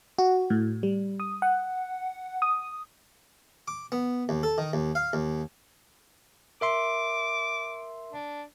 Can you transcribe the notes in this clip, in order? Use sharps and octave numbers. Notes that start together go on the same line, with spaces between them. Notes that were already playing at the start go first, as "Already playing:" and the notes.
F#4
A2
G3
D#6
F#5
D#6
D6
B3
D#2
A4
D#3
D#2
F5
D#2
A#4 E5 C6 D6
D4